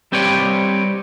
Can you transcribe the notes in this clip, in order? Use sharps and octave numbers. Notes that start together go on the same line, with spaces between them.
G3 C4 G4 B4 C#5 D5